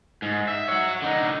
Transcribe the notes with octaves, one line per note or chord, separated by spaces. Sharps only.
G#2
E5
C#5 F#5
D3 D#4